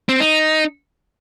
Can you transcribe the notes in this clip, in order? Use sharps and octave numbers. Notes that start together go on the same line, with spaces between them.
C4
D#4